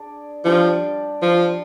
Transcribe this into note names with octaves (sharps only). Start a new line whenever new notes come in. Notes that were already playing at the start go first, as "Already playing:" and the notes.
Already playing: D4 G#4 D5
F3 G3 D4 G4 D5
F3